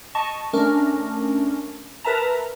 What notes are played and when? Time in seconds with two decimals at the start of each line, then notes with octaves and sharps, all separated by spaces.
0.15 D#5 A5 C#6
0.53 A3 C#4 D4 A#4
2.05 A#4 B4 E5 A5 A#5